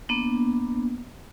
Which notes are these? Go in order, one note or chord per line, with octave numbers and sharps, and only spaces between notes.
A#3 B3 D4